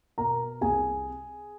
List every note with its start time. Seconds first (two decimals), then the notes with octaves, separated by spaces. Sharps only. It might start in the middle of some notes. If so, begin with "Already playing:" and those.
0.18 B2 A#4 A#5
0.61 C2 G#4 G#5